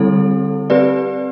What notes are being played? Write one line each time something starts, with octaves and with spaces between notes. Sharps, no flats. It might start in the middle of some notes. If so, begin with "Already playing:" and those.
Already playing: D3 G3 C4 E4 A4
C4 G4 B4 D5